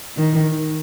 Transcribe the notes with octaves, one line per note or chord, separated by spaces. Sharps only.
D#3